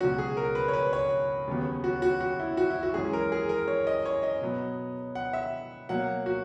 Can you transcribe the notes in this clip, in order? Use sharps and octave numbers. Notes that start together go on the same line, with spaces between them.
C#2 B2 F#3 C#4 F#4
G#4
A#4
B4
C#5
B4
C#5
D#2 C#3 F#3 B3
F#4
F#4
F#4
E4
F#4
E4
F#4
F#2 E3 G#3 C#4 G#4
A#4
G#4
A#4
C#5
D#5
C#5
D#5
B2 F#3 B3
F#5
E5
B2 F#3 A#3 F#5
F#4